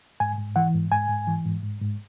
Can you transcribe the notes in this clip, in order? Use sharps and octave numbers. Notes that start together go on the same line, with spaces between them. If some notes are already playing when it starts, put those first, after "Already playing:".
G#2 G#5
G#2
E3 F#5
G#2
G#2 G#5
G#2
E3
G#2
G#2
G#2